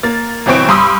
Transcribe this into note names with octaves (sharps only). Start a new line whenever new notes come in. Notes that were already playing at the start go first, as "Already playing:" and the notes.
A#3 A6
G1 B2 E3 C4 C#6 D7
G2 B5 C6 D#6 E6